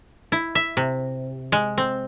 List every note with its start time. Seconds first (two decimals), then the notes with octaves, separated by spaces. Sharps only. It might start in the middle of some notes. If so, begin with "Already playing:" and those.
0.32 E4
0.55 E5
0.77 C3
1.52 G#3
1.78 C4